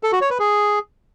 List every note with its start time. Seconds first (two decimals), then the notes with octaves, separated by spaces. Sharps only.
0.03 A4
0.12 F#4
0.21 C#5
0.30 B4
0.39 G#4